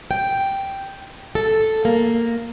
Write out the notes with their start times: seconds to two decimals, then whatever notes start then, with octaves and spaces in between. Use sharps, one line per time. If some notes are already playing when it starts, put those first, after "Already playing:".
0.11 G5
1.35 A4
1.85 A#3